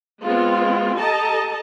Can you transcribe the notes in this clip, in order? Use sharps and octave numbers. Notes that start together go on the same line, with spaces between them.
G#3 B3 C4 F4
G4 A4 D#5 A5 A#5